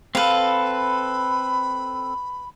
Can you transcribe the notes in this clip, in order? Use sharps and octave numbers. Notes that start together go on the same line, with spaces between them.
C4 A4 B4 F5 B5